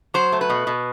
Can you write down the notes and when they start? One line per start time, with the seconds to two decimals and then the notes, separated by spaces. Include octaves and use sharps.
0.14 F#3 C5
0.32 A3
0.41 B4
0.50 B2
0.67 B2